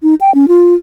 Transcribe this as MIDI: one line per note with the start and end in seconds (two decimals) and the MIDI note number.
0.03 0.15 63
0.21 0.33 79
0.34 0.46 61
0.48 0.74 65